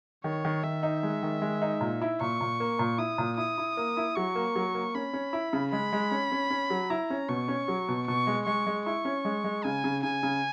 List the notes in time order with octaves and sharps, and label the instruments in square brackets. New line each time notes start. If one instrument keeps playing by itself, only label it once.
[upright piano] D#3 [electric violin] C#5
[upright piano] D#3
[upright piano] D#3 [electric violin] E5
[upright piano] D#4
G#3
D#3
G#3
D#4
A#2
E4
[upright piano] A#2 [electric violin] C#6
[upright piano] A#2
A#3
A#2
[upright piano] E4 [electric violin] D#6
[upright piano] A#2
[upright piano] E4 [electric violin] D#6
[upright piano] E4
A#3
E4
[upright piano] F#3 [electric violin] C#6
[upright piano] A#3
F#3
A#3
[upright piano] C#4 [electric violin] B5
[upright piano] C#4
E4
C#3
[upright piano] G#3 [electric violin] B5
[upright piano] G#3
C#4
C#4
C#4
F#3
[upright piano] E4 [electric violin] A#5
[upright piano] C#4
[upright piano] B2 [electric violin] C#6
[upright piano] C#4
F#3
B2
[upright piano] B2 [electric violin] C#6
[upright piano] G#3
[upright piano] G#3 [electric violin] C#6
[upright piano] G#3
[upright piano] E4 [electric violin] C#6
[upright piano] C#4
G#3
G#3
[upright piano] C#3 [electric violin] G#5
[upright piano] C#3
[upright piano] C#3 [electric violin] G#5
[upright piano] C#3